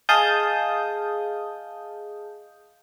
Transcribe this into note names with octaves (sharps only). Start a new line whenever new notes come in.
G#4 D#5 F5 A5 D#6 G6